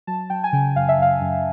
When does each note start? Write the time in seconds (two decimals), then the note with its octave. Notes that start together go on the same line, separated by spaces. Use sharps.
0.07 F#3 A5
0.30 F#3 G5
0.44 G#5
0.53 C#3 G5
0.76 F#2 F5
0.89 E5
0.98 F#2 F5
1.21 F#2